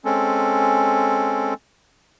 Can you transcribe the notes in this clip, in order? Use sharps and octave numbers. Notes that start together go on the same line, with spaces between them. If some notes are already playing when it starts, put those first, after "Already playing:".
G#3 C4 C#4 A4